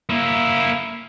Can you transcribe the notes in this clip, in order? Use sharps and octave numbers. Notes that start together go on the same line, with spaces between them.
A#3 E4